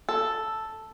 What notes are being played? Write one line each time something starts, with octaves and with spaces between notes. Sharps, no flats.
A4